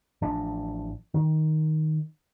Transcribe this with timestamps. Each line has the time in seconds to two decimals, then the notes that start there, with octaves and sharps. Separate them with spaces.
0.22 A1 F3 D4
1.14 D#3